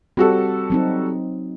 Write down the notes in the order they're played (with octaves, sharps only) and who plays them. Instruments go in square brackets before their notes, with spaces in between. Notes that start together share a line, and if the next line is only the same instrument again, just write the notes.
[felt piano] G3 F#4 A4 [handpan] C4
[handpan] F#3 C4 D#4